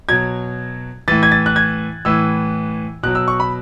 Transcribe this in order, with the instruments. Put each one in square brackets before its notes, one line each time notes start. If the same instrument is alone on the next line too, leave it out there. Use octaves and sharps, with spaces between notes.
[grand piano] B2 F#3 G#6
A2 E3 A6
G#6
A6
F#6
G#6
A2 E3 E6
B2 F#3 F#6
E6
C#6
B5